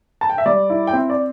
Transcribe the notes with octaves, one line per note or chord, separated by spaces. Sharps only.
A5
G5
E5
G3 D5
E4
G5
C4 E5
D5